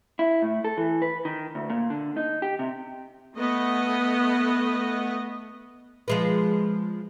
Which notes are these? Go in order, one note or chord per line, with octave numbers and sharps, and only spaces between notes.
E4
A2
A4
E3
B4
D#3
D2
A#2
D3
D#4
G4
C3
A3 B3 D#5
F3 G#3 B4